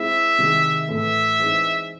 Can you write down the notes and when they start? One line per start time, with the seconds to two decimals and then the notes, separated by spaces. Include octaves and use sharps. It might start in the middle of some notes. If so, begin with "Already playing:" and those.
Already playing: G#3 C4 E4 E5
0.38 C3 D#3 G#3
0.89 A2 E3 A3 E5
1.39 E3 G#3 C4 D#4